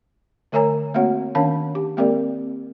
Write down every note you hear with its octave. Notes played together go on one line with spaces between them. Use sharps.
D3 A3 A#4 C#5 G#5 A#5
A3 A#3 C4 F#4 C#5 F#5
D#3 C#4 D4 C#5 F5 A5
G4
G#3 A#3 C4 G4 A#4 D5